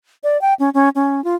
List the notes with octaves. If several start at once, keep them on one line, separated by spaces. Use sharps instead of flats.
D5
G5
C#4
C#4
C#4
F4